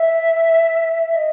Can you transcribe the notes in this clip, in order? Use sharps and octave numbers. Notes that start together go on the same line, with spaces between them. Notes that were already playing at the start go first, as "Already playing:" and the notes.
Already playing: E5
D#5